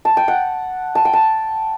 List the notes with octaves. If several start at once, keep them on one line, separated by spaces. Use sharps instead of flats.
A5
G5
F#5
A5
G5
A5